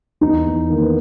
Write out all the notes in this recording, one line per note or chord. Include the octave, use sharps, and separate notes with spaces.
E2 D#4
E2
D#3 A#3
B3